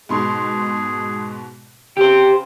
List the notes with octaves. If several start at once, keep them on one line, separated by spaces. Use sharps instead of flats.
G#2 B2 G#4 C6
C#3 G4 C5 G5